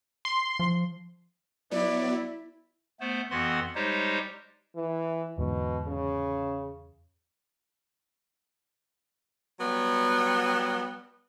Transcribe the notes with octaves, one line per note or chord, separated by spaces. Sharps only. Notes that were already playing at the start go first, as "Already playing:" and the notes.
C6
F3
F#3 B3 E4 D5
A3 B3 C5
F2 E3 B3 F#4 F#5 C6
G3 G#3 D#4 G4 C5 C#5
E3
E2 G#2 B2 D3
C#3
F#3 G3 B3